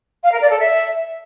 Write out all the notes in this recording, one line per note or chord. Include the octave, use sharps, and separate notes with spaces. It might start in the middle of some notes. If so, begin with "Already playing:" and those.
F5
A#4
D5
A4
E5